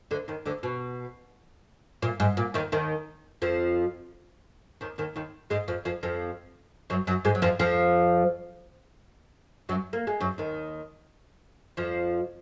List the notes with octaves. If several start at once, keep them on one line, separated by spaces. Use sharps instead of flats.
D2 D3
D#2 D#3
D2 D3
B2
A#2
G#2
A#2
D#2 D#3
D#2 D#3
F2 F3
D#2 D#3
D#2 D#3
D#2 D#3
G#2 G#3
F2 F3
F2 F3
F2 F3
F#2 F#3
F#2 F#3
G#2 G#3
F#3
F2 F3
F2 F3
F#2 F#3
A#3
G#3
F#2 F#3
D#2 D#3
F2 F3